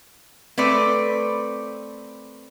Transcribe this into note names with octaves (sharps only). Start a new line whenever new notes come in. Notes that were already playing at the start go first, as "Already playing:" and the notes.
A3 C4 B4 D5